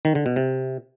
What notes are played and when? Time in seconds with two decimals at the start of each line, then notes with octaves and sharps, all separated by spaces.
0.05 D#3
0.15 D3
0.26 B2
0.36 C3